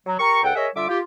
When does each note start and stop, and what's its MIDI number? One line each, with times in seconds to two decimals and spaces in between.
0.06 0.16 54
0.19 0.39 67
0.19 0.39 70
0.19 0.39 82
0.19 0.39 85
0.43 0.54 37
0.43 0.54 69
0.43 0.54 78
0.43 0.54 79
0.55 0.68 68
0.55 0.68 70
0.55 0.68 73
0.55 0.68 75
0.55 0.68 76
0.75 0.88 50
0.75 0.88 55
0.75 0.88 65
0.75 0.88 76
0.75 0.88 86
0.89 1.00 65
0.89 1.00 67